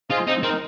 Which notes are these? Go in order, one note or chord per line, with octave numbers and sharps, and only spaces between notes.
F4 G#4 C5 D#5
C4 D#4
C4 D#4 A#4